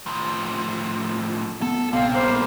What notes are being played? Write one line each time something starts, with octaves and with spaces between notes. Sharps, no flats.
A2 F3
B3 A4
A#1 C3 B3 F5
G3 A#3 C5